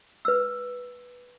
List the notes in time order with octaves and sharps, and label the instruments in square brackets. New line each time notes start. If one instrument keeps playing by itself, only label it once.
[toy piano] B4 E6